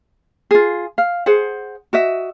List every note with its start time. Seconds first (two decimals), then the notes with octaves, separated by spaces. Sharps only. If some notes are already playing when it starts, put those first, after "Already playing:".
0.51 F4 G#4
0.98 F5
1.26 G#4 C5 F#5
1.93 F#4 D#5 E5